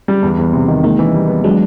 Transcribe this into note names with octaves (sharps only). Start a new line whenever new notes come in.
G3
E2
E2
C3
D#3
G#3 A#3 D#4
E3
G3
B3
F#3 G#3 D4